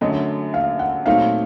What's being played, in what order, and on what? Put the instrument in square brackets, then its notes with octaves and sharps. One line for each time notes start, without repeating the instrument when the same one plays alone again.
[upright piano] F#2 D3 F#3 A3 [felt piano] D#5
[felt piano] F5
F#5
[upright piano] A#2 F#3 A3 C4 D#4 [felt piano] F5